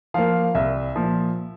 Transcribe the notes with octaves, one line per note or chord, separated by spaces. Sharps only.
F3 A#3 F5
C2 E5
A#2 F3